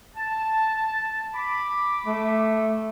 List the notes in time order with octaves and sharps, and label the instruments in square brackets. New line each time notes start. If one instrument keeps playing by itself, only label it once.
[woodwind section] A5
B5 D6
[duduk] A3